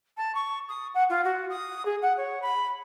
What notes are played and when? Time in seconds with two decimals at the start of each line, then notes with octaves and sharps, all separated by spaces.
0.17 A5
0.34 C#6
0.68 D#6
0.94 F#5
1.09 F4
1.24 F#4
1.49 D#6
1.85 G#4
2.02 F#5
2.17 C#5
2.42 B5